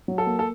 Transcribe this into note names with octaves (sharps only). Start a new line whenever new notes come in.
F#3
A4
A#3
A4